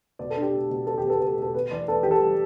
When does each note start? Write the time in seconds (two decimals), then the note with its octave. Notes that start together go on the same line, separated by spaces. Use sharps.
0.19 B2 D5
0.30 A4
0.36 D4
0.42 G4
0.53 B2
0.70 B2
0.87 B2 A4
0.98 G4
1.04 B3
1.10 A4
1.20 B2 A4
1.37 B2
1.42 A4
1.54 B3 B4
1.71 E3 D5
1.88 B3 A4
2.03 E3 G4
2.11 A4
2.22 G3